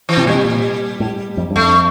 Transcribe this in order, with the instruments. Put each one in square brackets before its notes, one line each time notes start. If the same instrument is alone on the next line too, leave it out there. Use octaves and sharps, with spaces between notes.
[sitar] E3
[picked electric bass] C3
[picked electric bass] A#2 [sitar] G3
[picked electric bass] C3
A#2
A2
F2
G2
[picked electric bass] F2 [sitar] A3